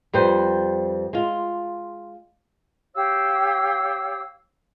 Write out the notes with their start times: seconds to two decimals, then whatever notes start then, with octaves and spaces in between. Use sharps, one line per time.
0.13 F2 G3 B4 C5
1.13 G#3 F4
2.95 G4 C#5 F5 E6